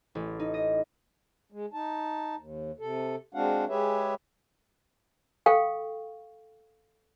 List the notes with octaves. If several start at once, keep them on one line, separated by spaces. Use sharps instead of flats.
A1
D#4
D#5
G#3
D#4 A5
D#2
C3 A4
G#3 C4 D4 F#4 F5 F#5
G#3 G4 G#4 B4 C#5 E5
A4 F5 G5 C#6